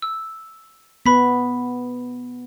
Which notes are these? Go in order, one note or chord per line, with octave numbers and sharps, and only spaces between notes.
E6
B3 B4 B5 B6